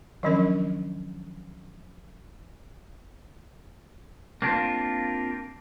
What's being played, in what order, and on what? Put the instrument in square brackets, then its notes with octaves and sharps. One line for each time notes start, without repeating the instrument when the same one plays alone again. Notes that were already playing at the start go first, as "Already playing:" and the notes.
[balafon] D#3 F3 F#3 C#4 D4 A#4
[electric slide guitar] A#3 C4 D4 F4